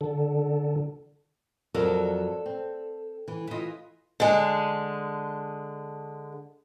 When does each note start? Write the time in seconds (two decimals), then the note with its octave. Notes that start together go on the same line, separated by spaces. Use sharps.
0.01 D3
1.75 F2 F#3 A4 A#4 D5 D#5
2.46 C4
3.28 E3
3.48 E3 E4 F4 D#5
4.20 D3 G#3